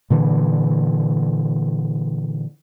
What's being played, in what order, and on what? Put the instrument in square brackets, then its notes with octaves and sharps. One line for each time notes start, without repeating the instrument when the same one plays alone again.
[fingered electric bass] A#2 D3 E3